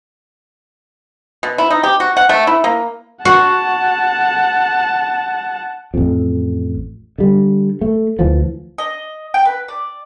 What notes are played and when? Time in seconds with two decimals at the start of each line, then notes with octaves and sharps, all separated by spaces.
1.43 B2
1.58 E4
1.70 D#4
1.83 G4
2.00 F#4
2.17 F#5
2.29 A3
2.47 E4
2.64 A#3
3.25 F#4 F#5 A5
5.94 A1 F2
7.18 D3 G3
7.81 A3
8.19 D2 E3 F3
8.78 D#5
9.34 G5
9.45 B4
9.68 D5